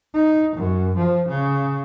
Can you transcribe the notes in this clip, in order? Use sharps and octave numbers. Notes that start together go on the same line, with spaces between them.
D#4
F#2
F3
C#3